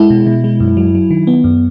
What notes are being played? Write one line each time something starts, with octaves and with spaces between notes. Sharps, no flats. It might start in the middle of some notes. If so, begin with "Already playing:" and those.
Already playing: G#3 E4
B2
B2
G#3
F#2
F#3
F#3
D#3
B3
F#2